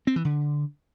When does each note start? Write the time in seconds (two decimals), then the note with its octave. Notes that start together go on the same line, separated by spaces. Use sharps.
0.07 C4
0.16 E3
0.25 D3